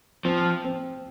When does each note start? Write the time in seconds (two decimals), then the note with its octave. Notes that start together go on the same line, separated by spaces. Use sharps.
0.25 F3 C4
0.64 C4